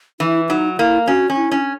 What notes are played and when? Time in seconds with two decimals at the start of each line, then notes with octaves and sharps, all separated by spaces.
0.20 E3 E4
0.49 F#3 D#4
0.78 A#3 E4
1.07 C#4 F#4
1.30 C#4
1.36 E4
1.51 C#4